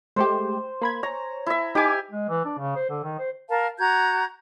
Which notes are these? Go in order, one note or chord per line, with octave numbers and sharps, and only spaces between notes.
G#3 A3 G4 C5
A#3 B5 G#6
C#5 A#5
E4 E5
D#4 G4 G#5 D6
G#3
E3
D4
C#3
C5
D3
D#3
C5
A#4 F5 A5
F#4 A#5 G6 G#6